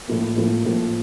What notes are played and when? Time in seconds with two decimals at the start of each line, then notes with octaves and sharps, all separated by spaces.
0.07 A2 F3 A#3
0.36 A2 F3 A#3
0.65 A2 F3 A#3